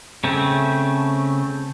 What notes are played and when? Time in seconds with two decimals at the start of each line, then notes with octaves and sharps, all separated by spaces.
0.24 C#3 A3 C4